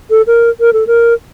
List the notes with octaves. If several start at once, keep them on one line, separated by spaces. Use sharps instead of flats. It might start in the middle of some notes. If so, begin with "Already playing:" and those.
A4
A#4
A#4
A4
A#4